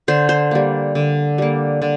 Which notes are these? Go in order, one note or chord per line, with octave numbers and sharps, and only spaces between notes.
D3 C5
C5
G3 A#3
D3
G3 A#3
D3